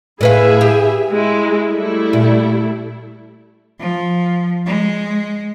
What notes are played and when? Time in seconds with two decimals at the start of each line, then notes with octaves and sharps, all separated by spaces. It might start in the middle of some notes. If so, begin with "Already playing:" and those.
0.21 A2 E4 G#4 B4 E5 F5
0.61 G4
1.11 G#3 E4
1.69 G3 A3 E4
2.13 A#2
3.79 F3
4.66 G#3